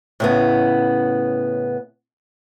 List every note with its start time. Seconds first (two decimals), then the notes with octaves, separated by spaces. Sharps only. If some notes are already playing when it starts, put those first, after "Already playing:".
0.20 A2 C#3 B3